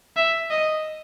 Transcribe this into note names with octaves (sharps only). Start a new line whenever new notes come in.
E5
D#5